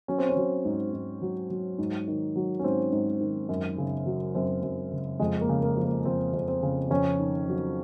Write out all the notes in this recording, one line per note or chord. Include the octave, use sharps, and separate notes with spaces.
F#3 C#4
C4
C#4
F#3
G#2
G#2
F#3
F#3
G#2
D#3
F#3
C#4
G#2 C4
G#2
D#3
F#2
C#3
F#3
F#2 C4
F#2
C#3
F2 G#3
A#3
C#3
A#3
F3
A#3
F2 C4
F2
C4
C#3
F2 C#4
D#3
F#3